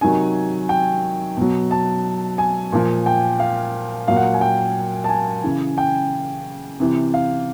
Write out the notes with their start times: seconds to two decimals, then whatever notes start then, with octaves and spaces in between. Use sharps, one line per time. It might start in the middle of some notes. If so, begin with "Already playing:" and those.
0.01 C3 D#3 F#3 G#5
0.69 G5
1.37 B2 F#3
1.71 A5
2.38 G#5
2.72 A#2 F3
3.06 G5
3.40 F5
4.08 A#2 F#3 F5
4.17 F#5
4.34 G#5
4.41 G5
5.04 A5
5.09 G#5
5.43 C#3 E3
5.78 G5
6.80 C3 E3
7.14 F5